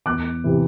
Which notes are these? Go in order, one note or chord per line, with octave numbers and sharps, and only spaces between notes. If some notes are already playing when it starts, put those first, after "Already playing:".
E2 D6 F#6
C3 E3